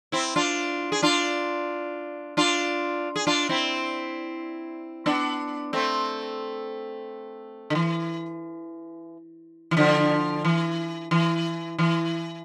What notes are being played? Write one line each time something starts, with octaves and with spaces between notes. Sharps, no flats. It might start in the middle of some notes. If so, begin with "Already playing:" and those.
C4 E4
D4 F4
G#4
D4 F4
D4 F4
G#4
D4 F4
C4 E4
B3 D4
A3 C4
D3
E3
E3
D3 F3
E3
E3
E3